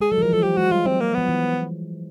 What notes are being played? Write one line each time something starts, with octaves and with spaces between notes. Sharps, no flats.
G#3 G#4
F#3 A4
E3
F3 A#4
F3 A4
F#3 G4
G#3 F#4
G3 F4
F#3 C4
A#3
F3 B3
E3